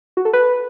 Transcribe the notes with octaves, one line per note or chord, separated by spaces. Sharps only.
F#4
A4
B4